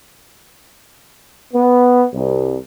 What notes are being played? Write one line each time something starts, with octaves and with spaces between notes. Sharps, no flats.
B3
C2